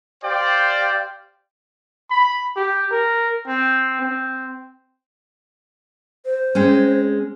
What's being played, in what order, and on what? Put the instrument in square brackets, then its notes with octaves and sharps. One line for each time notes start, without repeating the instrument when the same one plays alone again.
[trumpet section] G4 C5 D5 F5 G5
[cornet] B5
G4
A#4
C4
C4
[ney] C5
[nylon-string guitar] G#3 C4 C#4